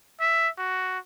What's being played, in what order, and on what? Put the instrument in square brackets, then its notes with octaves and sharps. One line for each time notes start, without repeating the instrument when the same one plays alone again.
[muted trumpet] E5
F#4